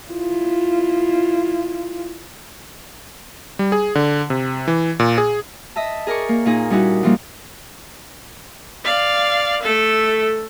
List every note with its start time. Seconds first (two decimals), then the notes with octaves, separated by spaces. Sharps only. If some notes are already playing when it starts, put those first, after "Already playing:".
0.12 E4 F4
3.59 G3
3.72 G#4
3.95 D3
4.30 C3
4.68 E3
5.00 A#2
5.18 G#4
5.76 D#5 E5 A5
6.07 G#4 A#4 D5 C#6
6.29 A#3
6.46 A#2 D#4 G#4
6.70 G3 C#4 D#4 E4 F#4
7.03 E3 F3 G3 A#3
8.84 D5 F5
9.63 A3 A4